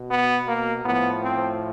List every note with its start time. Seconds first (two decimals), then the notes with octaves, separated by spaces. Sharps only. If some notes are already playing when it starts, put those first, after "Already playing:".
Already playing: B2
0.11 B3
0.48 A#3
0.86 A2 F3 B3
1.23 C4